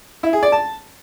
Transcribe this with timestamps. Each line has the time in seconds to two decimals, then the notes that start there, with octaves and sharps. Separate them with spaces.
0.23 E4
0.33 G#4
0.43 D5
0.52 A5